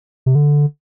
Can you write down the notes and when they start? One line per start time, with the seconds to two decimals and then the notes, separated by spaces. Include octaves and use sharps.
0.26 C3
0.35 D3